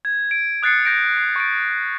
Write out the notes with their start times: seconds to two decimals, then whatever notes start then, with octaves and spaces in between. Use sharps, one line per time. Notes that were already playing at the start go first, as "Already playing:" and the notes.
0.05 G#6
0.31 D7
0.63 D#6 F#6 A6 C7 C#7
0.85 G6 A#6 C#7 D7
1.17 C7
1.36 C#6 A6 D7